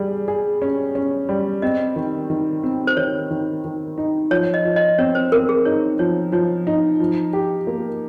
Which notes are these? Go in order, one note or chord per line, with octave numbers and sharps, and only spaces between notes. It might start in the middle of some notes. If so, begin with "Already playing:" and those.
Already playing: G3 G#4
G#4
C#4
C#4
G3
C4 D#5
D#3
D#3
C4
C5
D#3 C#5
D#3
D#3
D#4
F3 C#5
D#5
F3
D#5
C4 C#5
C5
C4 A#4
G#4
D#4 C#5
F3 C#5
F3 C#5
D#4
F3
G4
A#3